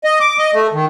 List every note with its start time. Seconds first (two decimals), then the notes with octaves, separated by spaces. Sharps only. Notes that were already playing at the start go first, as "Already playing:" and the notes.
0.04 D#5
0.20 D6
0.38 D#5
0.54 A3
0.73 D#3